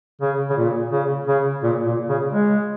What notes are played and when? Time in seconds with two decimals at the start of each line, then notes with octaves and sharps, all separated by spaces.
0.21 C#3
0.50 C#3
0.57 A#2
0.91 C#3
1.28 C#3
1.63 A#2
1.86 A#2
2.09 C#3
2.33 G#3